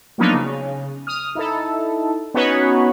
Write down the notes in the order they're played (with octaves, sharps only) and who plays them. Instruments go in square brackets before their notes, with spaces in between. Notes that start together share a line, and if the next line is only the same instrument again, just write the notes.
[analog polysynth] F3 F#3 A#3 B3 D4 D#4
C#3
D#6 F6
D#4 E4 A4
B3 C#4 D#4 F#4 B4 C#5